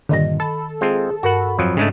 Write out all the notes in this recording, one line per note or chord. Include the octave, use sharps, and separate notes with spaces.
G2 A#2 D3 D#3 D#5 A#6
A4 B5
G#3 C4 F4 G#4
G2 F#4 A#4 F#5 B5
F2 F3 F#3
G#2 C#3 G#3 A3 D4